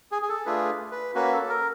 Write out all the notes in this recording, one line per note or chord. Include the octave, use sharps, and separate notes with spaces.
G#4
G#4
A4
A3 D4 F4 G#4 B4
B4
A#3 C#4 F#4 B4
A4
A#4